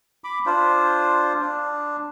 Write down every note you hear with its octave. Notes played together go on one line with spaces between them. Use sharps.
B5 D6
D4 F4 C5
D4